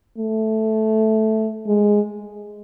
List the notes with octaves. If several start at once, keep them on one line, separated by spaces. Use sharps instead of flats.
A3
G#3